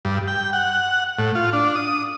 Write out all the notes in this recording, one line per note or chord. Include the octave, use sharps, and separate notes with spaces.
G2
G5
F#5
A2
F4
D4
D#6